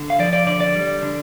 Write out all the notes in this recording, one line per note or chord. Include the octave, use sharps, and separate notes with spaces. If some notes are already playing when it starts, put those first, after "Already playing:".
Already playing: D3
F5
F3 D5
D5
D3 D5
D5
G3
D3